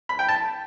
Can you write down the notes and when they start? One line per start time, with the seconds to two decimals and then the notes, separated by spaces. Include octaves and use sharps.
0.09 B5
0.19 G5
0.29 A5